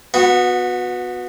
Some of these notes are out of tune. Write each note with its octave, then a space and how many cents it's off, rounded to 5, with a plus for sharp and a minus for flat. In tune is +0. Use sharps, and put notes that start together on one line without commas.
B3 +0 F#4 -25